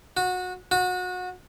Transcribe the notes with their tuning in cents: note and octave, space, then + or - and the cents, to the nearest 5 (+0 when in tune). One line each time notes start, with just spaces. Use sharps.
F#4 -20
F#4 -25